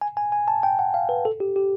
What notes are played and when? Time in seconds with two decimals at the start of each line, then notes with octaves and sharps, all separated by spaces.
0.01 G#5
0.17 G#5
0.32 G#5
0.48 A5
0.63 G5
0.79 F#5
0.94 F5
1.09 B4
1.25 A4
1.40 G4
1.56 G4